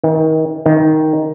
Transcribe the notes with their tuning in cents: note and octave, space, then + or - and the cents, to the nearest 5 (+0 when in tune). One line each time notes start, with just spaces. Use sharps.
D#3 +30
D#3 +5